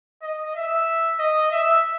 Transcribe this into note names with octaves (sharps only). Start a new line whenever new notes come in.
D#5
E5
D#5
E5